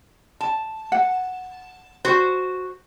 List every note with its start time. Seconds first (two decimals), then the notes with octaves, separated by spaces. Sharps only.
0.41 A5
0.92 F#5
2.05 F#4 C5